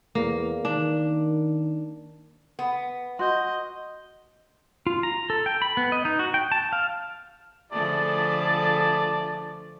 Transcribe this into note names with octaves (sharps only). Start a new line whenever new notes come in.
E2 A#3
D#3 D4
B3
F#4 D#5 C6 G6
F4
A#5
A4
G5
B5
B3
D#5
D#4
F#4
G5
A5
F5
D3 F3 A3 E4 G#4 D5 A5